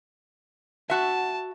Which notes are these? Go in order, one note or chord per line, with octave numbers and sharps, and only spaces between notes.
F#4 E5 A5